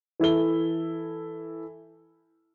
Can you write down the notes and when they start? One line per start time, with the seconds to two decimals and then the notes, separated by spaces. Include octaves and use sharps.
0.20 E3 E4 A4 G7